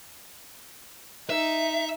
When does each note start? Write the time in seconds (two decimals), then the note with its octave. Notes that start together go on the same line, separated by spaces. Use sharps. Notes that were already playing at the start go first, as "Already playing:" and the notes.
1.30 D#4 E5